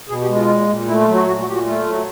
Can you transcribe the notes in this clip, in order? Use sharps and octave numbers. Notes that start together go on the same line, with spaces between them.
B2 G#4
G4
G#3
F4
A#2
A#2
A3 E4
F4
F#3
F#4
A#2 F#4
F#4
A#2 G4
F#4
A3 F4
F#3